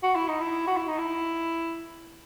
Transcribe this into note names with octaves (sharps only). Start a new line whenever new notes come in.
F#4
E4
D#4
E4
F#4
E4
D#4
E4